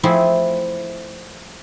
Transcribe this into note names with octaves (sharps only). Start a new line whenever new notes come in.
F3 A3 C4 E4 G#4